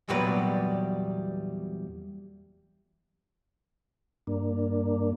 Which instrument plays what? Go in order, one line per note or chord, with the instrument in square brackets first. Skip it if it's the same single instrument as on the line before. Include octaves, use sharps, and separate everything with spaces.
[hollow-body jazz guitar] E2 A#2 F#3 G3 B4
[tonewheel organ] G2 A#3 D4